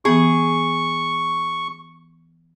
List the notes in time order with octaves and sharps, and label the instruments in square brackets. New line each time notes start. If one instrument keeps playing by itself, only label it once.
[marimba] E3 B3 [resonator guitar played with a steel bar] G#4 [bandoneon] C#6